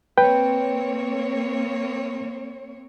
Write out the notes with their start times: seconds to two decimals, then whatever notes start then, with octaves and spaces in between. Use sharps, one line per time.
0.18 A#3 C4 B4 C#5 G5